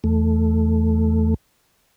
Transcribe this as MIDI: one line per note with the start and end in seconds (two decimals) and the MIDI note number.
0.04 1.34 40
0.04 1.34 57